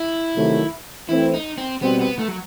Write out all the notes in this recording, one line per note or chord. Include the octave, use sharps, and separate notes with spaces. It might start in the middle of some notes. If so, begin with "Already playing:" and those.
Already playing: E4
C3 D#3 F#3 A3
E3 A3 C4 E4
D#4
C4
B2 G3 B3 C4
B3
A3
F#3